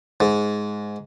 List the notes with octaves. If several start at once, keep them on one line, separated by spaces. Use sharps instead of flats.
G#2